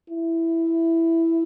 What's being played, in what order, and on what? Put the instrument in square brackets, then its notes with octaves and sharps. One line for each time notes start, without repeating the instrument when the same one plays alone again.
[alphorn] E4